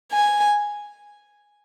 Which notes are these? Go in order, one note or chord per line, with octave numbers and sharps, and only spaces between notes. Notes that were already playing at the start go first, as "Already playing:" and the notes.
G#5